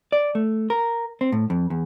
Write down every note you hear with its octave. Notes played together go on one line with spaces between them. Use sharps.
D5
A3
A#4
C4
A2
F2
E2